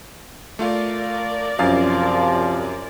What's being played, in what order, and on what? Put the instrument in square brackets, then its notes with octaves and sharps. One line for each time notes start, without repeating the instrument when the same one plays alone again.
[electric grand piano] A3 F4 F5 [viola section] A#4 D5
[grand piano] F#2 [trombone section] C3 F3 [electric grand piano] F5 A6